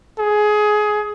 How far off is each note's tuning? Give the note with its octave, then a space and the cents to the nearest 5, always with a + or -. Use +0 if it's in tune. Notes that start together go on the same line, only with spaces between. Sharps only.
G#4 +20